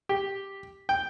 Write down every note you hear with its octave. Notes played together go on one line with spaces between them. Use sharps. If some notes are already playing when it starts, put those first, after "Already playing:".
G4
G5